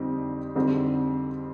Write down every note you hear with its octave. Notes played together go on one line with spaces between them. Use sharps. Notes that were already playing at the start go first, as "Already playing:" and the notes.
Already playing: F2 D3 G3 C4 D#4
F2 D3 G3 C4 D#4